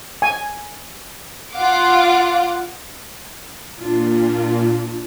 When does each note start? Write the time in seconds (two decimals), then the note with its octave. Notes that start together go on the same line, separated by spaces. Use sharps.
0.22 G#5
1.55 F4 F5 F#5 D6
3.79 A#2 D4 F4